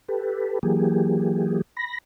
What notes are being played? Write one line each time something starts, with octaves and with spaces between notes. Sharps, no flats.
G4 A4 B4
E3 F#3 A#3 G4 G#4
B5 A#6